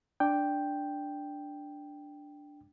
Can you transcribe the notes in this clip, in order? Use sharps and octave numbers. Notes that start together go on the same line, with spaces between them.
D4 G5